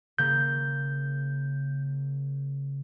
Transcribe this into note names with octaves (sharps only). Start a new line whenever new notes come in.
C#3 A#3 G6